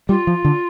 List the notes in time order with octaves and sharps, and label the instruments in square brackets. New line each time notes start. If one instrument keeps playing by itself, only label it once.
[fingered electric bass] G3 [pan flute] F4
[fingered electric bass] F3
D3